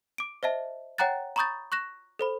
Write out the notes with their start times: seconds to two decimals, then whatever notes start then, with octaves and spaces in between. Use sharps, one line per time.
0.18 D6 D7
0.43 C5 D#5 E5 A5
0.98 C#5 F#5 G5 A#5 F#6 A6
1.36 A#5 B5 C#6 D#6 G6 A6
1.72 C#6 F#6 A#6 E7
2.19 A4 C5 B5